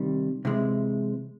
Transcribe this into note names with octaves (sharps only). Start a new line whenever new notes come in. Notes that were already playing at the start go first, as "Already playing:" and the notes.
Already playing: C3 D#3 G3 C4
C3 E3 G#3 C4